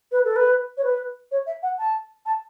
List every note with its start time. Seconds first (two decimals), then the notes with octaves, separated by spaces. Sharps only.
0.12 B4
0.25 A4
0.36 B4
0.77 C#5
0.84 B4
1.31 C#5
1.46 E5
1.62 F#5
1.79 A5
2.26 A5